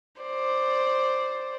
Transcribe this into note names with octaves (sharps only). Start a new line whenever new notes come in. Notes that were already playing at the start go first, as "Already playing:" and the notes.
C5 D5